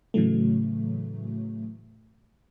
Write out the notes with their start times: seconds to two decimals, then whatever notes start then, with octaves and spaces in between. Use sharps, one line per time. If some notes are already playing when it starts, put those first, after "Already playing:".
0.14 A2 C#3 E3 F#3 A3